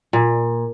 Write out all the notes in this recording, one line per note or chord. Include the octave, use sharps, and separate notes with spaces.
A#2